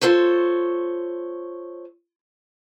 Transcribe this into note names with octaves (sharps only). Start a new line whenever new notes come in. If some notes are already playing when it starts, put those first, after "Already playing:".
F4 A4 C5 C#5